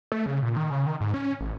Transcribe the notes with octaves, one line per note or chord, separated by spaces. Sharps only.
A3
C#3
A#2
D#3
C#3
D#3
G#2
C#4
A1